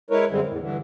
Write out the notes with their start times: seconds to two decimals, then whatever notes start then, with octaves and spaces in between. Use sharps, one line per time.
0.11 G#3 E4 A#4 B4 C#5
0.30 F#2 D3 G3 G#3 C4
0.47 E2 A2
0.59 G2 D3 E3